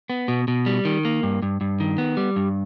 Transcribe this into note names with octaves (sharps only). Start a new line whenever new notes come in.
B3
B2
B2
G3
D#3
A#3
G2
G2
G2
D#3
B3
G3
G2